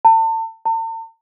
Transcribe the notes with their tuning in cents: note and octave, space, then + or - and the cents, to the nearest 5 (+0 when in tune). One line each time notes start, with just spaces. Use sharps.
A5 +35
A5 +45